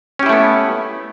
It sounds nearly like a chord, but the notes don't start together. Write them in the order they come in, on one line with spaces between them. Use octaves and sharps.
C#4 G4 E4 A3 B3